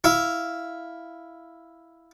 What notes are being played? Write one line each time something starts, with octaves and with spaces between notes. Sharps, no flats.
E4 F5